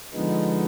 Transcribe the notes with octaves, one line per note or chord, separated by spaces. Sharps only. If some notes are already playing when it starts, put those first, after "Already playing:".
D3 F3 G#3 B3 D#4